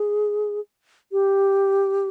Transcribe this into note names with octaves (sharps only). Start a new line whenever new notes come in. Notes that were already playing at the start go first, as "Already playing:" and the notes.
Already playing: G#4
G4